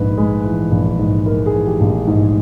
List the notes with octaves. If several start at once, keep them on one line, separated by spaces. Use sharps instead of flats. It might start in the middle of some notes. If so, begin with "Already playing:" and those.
Already playing: A#1 G#2 B4
G#3
E3
A#1
G#2
G#3 A#4
G#4
E3
G4
A#1
G#2